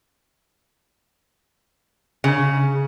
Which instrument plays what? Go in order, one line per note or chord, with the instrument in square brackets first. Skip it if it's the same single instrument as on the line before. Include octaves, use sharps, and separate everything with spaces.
[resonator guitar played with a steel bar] C#3